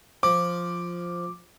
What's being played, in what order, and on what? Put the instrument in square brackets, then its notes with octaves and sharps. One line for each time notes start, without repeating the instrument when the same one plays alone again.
[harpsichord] F3 [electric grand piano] D6